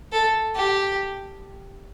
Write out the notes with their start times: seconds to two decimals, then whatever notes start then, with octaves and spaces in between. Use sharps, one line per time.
0.12 A4
0.55 G4